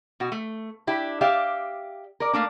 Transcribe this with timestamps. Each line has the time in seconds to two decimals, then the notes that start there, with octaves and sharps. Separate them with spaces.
0.20 B2 F#4
0.32 A3
0.87 D4 E4 G4
1.21 G4 D5 E5 F5
2.20 A#4 D5
2.33 A3 A#3 D4